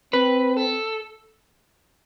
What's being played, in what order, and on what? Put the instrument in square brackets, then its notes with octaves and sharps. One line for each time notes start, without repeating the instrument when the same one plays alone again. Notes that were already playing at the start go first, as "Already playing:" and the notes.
[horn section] C4 [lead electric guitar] B4
[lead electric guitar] A4